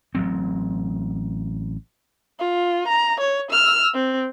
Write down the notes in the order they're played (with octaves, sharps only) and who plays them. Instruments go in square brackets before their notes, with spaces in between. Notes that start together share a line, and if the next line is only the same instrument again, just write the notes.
[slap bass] A1 F#3 C4
[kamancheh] F4
A#5
C#5
E6 F6
C4